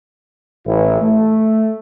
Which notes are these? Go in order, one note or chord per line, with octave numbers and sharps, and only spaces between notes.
A1 E4
A3